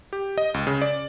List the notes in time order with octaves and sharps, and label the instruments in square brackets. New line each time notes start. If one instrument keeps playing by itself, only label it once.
[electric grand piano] G4
D#5
C#2
C#3
D5